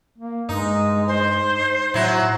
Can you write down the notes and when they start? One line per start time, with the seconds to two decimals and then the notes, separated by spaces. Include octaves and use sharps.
0.18 A#3
0.49 G2 G#3 D#4
1.07 C5
1.94 A2 F#3 E4 F#4